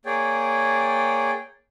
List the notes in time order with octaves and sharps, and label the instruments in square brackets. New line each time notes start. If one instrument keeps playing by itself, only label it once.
[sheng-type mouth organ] A#3 G#4 C#5 D5 G5